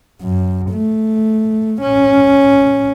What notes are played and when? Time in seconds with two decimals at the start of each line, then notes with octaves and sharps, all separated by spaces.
0.22 F#2
0.71 A3
1.82 C#4